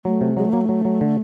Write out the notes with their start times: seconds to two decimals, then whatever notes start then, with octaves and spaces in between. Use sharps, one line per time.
0.05 F#3 A3
0.21 C3
0.37 F#3 G#3
0.45 A3
0.53 F#3 A#3
0.61 A3
0.69 F#3
0.85 F#3
1.01 D3